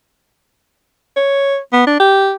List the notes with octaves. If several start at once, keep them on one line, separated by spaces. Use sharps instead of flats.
C#5
B3
D4
G4